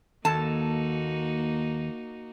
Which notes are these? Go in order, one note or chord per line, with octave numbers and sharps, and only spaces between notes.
D#2 A#3 D#4 F#4 A4 A5